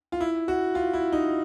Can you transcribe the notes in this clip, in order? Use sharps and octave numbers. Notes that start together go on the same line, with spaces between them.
F4
E4
F#4
F4
E4
D#4